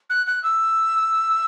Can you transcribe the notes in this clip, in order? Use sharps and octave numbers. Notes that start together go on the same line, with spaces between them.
F#6
F#6
E6